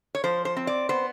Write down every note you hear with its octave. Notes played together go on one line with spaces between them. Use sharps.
C#5
F3 C5
C5
C4
D5
B3 C5